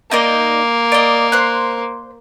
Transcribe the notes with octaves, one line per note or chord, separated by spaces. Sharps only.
A#3 D#4 D5 D#5
D5 D#5
C5 F#6